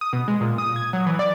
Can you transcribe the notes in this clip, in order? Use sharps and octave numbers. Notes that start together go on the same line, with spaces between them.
D#6
B2
G#3
A#2
D#6
G#6
F#3
E3
D5